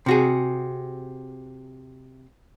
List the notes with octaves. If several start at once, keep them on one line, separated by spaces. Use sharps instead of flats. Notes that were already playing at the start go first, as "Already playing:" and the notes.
C3 F#4 G#4